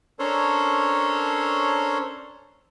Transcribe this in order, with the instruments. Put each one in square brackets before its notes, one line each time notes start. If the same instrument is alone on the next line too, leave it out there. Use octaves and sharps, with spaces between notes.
[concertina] C#4 D4 A4 A#4 C5 C#5